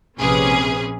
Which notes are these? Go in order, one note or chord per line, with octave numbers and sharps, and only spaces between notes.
A#1 C3 C#4 G#4 B4